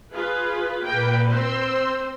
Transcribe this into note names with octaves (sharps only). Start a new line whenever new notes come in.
F4 G#4 B4
A#2 A#3 B4 G5
C4 C5 C6 E6